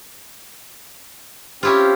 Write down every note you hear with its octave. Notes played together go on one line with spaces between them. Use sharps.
C4 C#4 E4 F4 G4